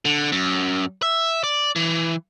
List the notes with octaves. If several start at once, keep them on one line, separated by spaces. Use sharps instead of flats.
D3
F#2
E5
D5
E3